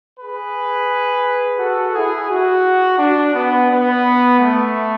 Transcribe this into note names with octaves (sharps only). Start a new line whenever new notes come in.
G#4 B4
F#4 A4
E4 G#4
F#4
D4
B3
B3
A3